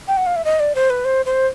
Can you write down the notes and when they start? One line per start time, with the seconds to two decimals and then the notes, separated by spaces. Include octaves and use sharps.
0.08 G5
0.17 F#5
0.26 F5
0.36 E5
0.45 D#5
0.60 D5
0.75 C5
0.90 B4
1.05 C5
1.26 C5